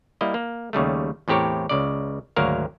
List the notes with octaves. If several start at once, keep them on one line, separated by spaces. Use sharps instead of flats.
G3 A#3 E4 D#5
A#3
D#2 C#3 G3 A3
E2 A2 C4 G4 A#4 C#5
C#2 C#3 D5
G#1 D2 F#3 A#3 A#4 F5